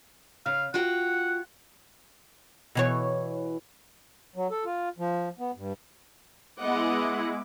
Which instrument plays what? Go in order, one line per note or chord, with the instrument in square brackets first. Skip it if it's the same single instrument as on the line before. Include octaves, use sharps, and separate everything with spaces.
[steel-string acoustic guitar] C#3 [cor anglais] F5
[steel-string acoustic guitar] F4 F#4 G5 [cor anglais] F#5
[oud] B2 E3 C#5
[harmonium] F#3
A4
F4
F3
B3
G2
[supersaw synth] G#3 E4 [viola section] B3 D#5 F#5 [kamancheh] D6